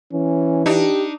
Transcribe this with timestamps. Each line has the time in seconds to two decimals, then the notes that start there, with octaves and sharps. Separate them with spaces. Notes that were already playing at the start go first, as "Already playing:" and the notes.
0.12 E3 C#4
0.66 D4 D#4 G4